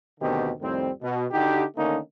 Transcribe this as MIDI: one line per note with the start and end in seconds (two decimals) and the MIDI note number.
0.20 0.50 38
0.20 0.50 47
0.20 0.50 50
0.20 0.50 51
0.20 0.50 60
0.20 0.50 67
0.60 0.90 41
0.60 0.90 45
0.60 0.90 51
0.60 0.90 55
0.60 0.90 60
1.01 1.25 47
1.31 1.62 50
1.31 1.62 63
1.31 1.62 66
1.31 1.62 67
1.76 1.97 50
1.76 1.97 51
1.76 1.97 57
1.76 1.97 58
1.76 1.97 61
1.76 1.97 63